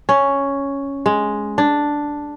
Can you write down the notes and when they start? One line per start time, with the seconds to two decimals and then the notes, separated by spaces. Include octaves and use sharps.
0.09 C#4
1.06 G#3
1.58 D4